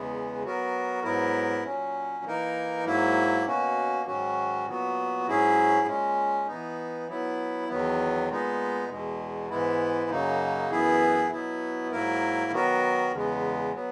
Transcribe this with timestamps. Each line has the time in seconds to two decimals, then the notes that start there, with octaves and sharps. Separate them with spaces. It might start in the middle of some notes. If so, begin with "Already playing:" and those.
Already playing: E2 C#3 E3 G#3 B3
0.43 F#3 B3 F#4 A#4
1.03 G#2 F#3 B3 E4 A#4
1.64 A#2 F#3 C#4
2.24 E3 A#3 D#4 A#4
2.85 G#2 F#3 A#3 E4
3.45 B2 A#3 C#4 F#4
4.06 G#2 D#3 F#3 C#4 F#4
4.66 A#2 F#3 B3 F#4
5.27 G#2 F#3 C#4 E4 G#4
5.87 A#2 G#3 C#4
6.47 E3 B3 D#4
7.08 F#3 B3 E4
7.68 E2 D#3 F#3 B3
8.29 A#2 G#3 B3 D#4
8.89 E2 B2 G#3
9.50 G#2 E3 G#3 B3 E4
10.10 F#2 C#3 F#3 A#3 D#4
10.70 F#2 E3 B3 E4 G#4
11.31 B2 F#3 B3 E4
11.91 G#2 F#3 A#3 E4 A#4
12.52 D#3 F#3 B3 F#4 A#4
13.12 E2 C#3 G#3 B3
13.74 F#3 B3